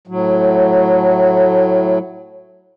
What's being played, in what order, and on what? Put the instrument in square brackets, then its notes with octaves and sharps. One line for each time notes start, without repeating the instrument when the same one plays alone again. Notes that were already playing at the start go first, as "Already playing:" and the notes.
[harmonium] A2 F#3